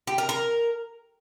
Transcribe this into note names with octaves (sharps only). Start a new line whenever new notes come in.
G4
A#4
A#4